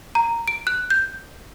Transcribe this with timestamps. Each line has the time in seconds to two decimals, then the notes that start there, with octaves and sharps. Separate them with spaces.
0.15 A#5
0.48 D7
0.67 F#6
0.90 G6